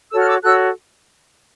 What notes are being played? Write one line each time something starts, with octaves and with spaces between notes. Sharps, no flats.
F#4 A4 C#5 E6
F6
D6 E6
F#4 A4 C#5 E6 F#6